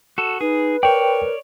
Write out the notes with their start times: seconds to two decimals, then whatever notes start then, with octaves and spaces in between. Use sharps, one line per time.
0.18 F#4 A4
0.41 D#4 G#4 B4
0.83 A#4 C#5 D5 G5